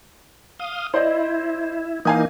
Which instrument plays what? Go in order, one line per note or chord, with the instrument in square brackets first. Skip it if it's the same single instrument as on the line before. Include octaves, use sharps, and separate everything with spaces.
[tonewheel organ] F5 D#6
[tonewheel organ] E4 [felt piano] C5 D5 D#5
[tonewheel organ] E3 A#3 D#4 [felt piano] F5 G#5 D#6